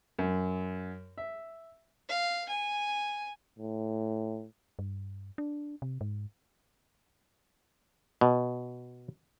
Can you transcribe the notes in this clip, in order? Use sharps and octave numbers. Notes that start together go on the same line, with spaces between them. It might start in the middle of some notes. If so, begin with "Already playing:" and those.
F#2
E5
F5
G#5
A2
G2
D4
C3
G#2
B2